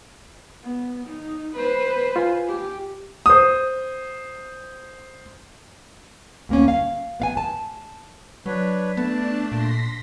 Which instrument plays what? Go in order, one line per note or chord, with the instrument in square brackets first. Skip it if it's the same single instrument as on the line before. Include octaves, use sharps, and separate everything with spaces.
[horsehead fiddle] B3
D#4
B4 C5
[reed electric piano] F4 G#5
[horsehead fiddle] G4
[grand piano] C5 D#6
[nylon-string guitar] D2 A#3 C#4
F5
B3 F5 G#5
A5
[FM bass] F#3 [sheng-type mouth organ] D4 B4 C#5
[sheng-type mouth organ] A3 A5 [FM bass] B3 [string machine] D4
[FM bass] A#2 [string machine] C6 A#6 B6